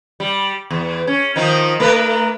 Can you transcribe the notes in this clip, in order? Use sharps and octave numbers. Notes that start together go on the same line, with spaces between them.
G3
E2
C#4
D#3 F3 D#4
A3 A#4 B4